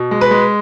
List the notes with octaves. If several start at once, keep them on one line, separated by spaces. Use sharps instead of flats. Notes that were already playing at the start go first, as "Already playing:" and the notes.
Already playing: B2
G#3
B4
G#3